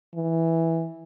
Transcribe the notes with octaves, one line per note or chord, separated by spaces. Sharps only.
E3